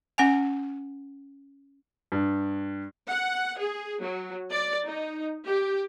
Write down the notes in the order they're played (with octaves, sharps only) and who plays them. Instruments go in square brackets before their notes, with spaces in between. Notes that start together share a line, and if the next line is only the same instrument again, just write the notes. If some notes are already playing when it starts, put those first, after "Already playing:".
[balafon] C#4 F#5 G#5
[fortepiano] G2
[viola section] F#5
G#4
F#3
D5
D#4
G4